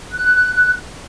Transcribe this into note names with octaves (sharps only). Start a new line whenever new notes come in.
F#6